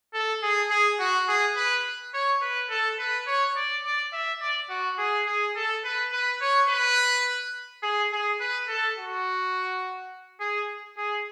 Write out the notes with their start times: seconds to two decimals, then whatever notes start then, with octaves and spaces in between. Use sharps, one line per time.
0.14 A4
0.43 G#4
0.70 G#4
1.00 F#4
1.28 G#4
1.56 B4
2.14 C#5
2.42 B4
2.70 A4
2.99 B4
3.27 C#5
3.56 D5
3.85 D5
4.13 E5
4.41 D5
4.70 F#4
4.98 G#4
5.26 G#4
5.56 A4
5.84 B4
6.13 B4
6.41 C#5
6.69 B4
7.83 G#4
8.12 G#4
8.40 B4
8.68 A4
8.97 F#4
10.40 G#4
10.98 G#4